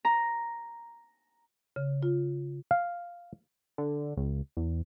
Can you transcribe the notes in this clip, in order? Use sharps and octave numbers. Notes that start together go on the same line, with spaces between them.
A#5
C#3
F4
F5
D3
C#2
E2